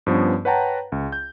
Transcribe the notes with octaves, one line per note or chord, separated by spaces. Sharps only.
G2 F3 B3 C#4
B4 C#5 F#5 G5 A5 A#5
C#2
G6